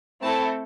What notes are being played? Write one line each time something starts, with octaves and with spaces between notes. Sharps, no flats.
A3 C4 E4 A4 A5